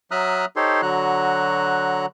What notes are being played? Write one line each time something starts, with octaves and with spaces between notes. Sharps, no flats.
F#3 E5 A#5 D#6 F6 F#6
D#4 G4 A4 C5 C#5 C6
D3 F#3 F#4 A#5 F#6